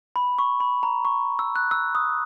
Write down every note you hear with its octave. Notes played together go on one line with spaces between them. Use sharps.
B5
C#6
B5
A#5
C#6
E6
F#6
E6
D#6